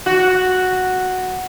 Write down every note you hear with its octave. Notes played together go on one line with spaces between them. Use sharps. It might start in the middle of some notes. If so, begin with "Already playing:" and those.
F#4